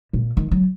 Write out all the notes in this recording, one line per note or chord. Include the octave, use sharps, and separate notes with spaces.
A#2
D#3
F#3